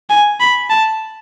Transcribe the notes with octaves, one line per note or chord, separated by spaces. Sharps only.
G#5
B5
A5